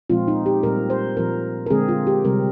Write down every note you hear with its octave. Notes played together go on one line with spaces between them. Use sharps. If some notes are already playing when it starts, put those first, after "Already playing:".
A#2 F3 G#3 C4 F4
D#4
G4
A#2 G3 C4 A#4
C5
A#2 F3 C4 A#4
A#4
D3 G#3 C4 G#4
F4
G4
C3 G3 C4 A#4